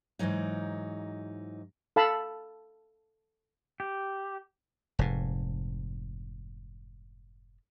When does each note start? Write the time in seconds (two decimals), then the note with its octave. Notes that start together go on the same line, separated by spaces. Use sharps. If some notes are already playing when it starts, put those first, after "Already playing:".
0.19 G#2 B2 E3 F#3 D#4
1.96 A4 F5 A5 B5
3.80 G4
4.99 F1 G#2